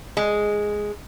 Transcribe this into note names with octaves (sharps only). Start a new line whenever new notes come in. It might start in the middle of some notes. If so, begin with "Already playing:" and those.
G#3